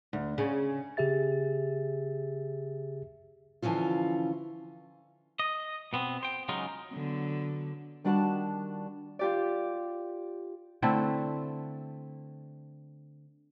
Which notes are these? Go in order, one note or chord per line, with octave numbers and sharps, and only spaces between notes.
D2
C#3
C#3 G4 G#4 E5 A6
D3 E3 F3 C#4 F4
D#5
B2 B3 C4
C5 G5
C#3 F#3 G#3 D#4 F4
D3 F#3 B3
D#3 G3 D4 F#4 F#5 A5
F4 G4 D5
D3 A3 C4 E4